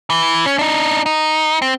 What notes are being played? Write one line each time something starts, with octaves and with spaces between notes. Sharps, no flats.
E3
C#4
D4 D#4
D#4
C4